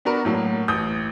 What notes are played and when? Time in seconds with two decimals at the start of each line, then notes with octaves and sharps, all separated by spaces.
0.05 B3 D4 F#4 A#4 B4
0.25 A2 F#3 A#3
0.68 A1 D#6 G6